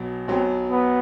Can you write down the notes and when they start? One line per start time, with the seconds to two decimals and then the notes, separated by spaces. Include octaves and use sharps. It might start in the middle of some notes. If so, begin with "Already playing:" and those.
Already playing: B1 B2 F#3
0.28 B1 B2 F#3 C4
0.70 B3